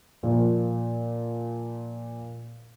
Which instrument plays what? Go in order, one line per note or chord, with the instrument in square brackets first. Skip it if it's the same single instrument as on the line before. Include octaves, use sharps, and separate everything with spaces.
[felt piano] A#2 F3